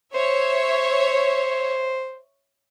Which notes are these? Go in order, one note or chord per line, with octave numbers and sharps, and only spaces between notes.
C5 C#5 E5